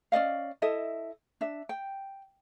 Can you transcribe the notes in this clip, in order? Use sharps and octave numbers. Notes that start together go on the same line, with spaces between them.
C#4 D5 D#5 F5
E4 A4 D#5 E5
D4 E5
G5